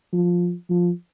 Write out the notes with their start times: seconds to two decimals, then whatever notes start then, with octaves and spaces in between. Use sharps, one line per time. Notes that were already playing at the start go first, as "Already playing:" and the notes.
0.13 F3
0.70 F3